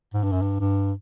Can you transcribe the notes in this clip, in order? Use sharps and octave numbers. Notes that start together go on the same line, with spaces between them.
G#2
G2
F#2
G2
G2